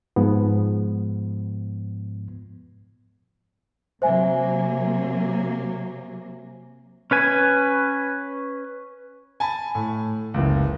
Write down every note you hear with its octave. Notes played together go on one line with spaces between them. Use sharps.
G#2 F3 B3
C3 F#3 A#3 C5 E5 G#5
C#4 B4 G#5
G#5 A5 B5
A2
F#1 C#2